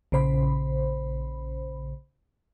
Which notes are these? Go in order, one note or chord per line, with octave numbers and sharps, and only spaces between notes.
A#1 C#3 C5 B5